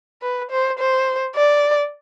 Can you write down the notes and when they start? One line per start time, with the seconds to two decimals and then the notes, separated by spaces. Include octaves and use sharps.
0.22 B4
0.51 C5
0.79 C5
1.36 D5